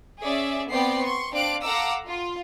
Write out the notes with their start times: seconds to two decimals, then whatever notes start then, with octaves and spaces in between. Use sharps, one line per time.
0.22 C#4 G#4 D5 E5
0.70 B3 C4 D5 G5 C7
1.02 C6 C#6
1.32 C4 D4 D5 F5 F#6 D7
1.62 A4 F5 F#5 A#5 D6 E6
2.07 F4